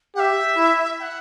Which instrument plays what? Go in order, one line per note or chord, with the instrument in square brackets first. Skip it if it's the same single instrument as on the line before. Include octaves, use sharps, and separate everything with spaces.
[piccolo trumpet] G4 [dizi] E5 F#5
[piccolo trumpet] E4
[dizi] G5
F#5